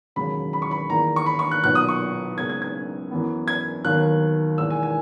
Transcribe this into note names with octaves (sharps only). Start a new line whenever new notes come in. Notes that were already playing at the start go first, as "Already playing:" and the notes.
E1 D#2 C#3 F#3 B5
B5
C#6
B5
E2 D#3 A#3 A#5
C#6
B5
C#6
F#6
B1 A#2 F#3 B3 F#6
D#6
C#6
F#1 F#2 C#3 G#3 B3 G#6
G#6
G#6
F#2 E3 B3
G#6
D#2 D#3 F#3 B3 F#6
E1 E2 D#3 A#3 E6
G#5
G#5